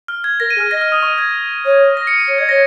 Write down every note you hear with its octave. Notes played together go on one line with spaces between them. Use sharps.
F6
G#6
A#4 A#6
D#7
G#4
F6
D#5 A#6
F6
D#6
C#6
G#6
C#5
A#6
C#7
D#7
C#5 C#7
D#5 G#6
C#5 A#6